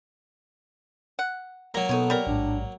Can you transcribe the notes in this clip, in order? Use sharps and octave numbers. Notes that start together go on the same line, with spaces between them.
F#5
F#3 A#3 A#5
B2 B3 D#4 A4 C#5
G3 A#4
A1 G#2 D4